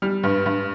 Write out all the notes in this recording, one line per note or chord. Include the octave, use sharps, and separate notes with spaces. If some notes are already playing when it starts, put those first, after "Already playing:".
G3 F6
G2
G2